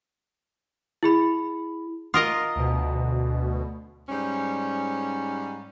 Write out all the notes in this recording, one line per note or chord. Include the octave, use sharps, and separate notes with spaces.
E4 G#4 B5
F4 A#4 D#5 F#5 C6 D#6
D2 B2
G#2 G3 C#4